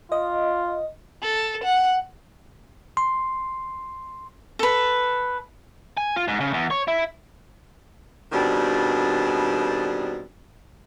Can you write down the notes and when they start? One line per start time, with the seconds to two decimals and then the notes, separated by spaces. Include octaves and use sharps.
0.12 F4 D#5
1.23 A4
1.64 F#5
2.97 C6
4.59 A4 B4
5.97 G#5
6.16 F4
6.28 G#2
6.40 C#3
6.53 E2
6.71 C#5
6.88 E4
8.32 B2 D#3 G3 C4 D4 G#4